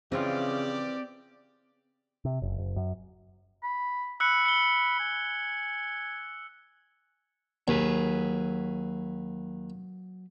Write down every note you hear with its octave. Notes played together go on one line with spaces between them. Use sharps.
C#3 E3 F3 C4 F4 G4 D5
C3
F#1
F#1
F#2
B5
B5 E6 F#6 C#7
C#7 G7
G#5
D#2 F#3 G#4 B4